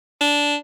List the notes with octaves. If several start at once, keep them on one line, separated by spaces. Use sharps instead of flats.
D4